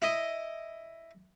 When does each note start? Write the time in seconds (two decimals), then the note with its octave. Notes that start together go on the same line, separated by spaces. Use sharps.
0.02 E4 D#5